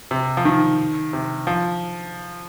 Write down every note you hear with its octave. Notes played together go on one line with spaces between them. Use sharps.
C3
F3
D#3
C3
F3